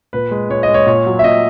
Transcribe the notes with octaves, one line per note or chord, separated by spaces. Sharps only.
A#2 B4
G#3
A#2 C#5
D#5
G#3
C#5
A#2 C#5
F#3
E5
A#2 D#5